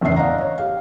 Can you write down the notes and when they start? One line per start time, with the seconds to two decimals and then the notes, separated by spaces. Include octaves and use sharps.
0.01 F#1 E2 A2 D4 E5 C7
0.16 D5 D#5 F5 F#5 A#5
0.41 C#5
0.58 G4 F5